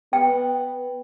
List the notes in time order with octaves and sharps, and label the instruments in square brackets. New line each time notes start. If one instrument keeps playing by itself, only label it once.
[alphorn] B3 [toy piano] G5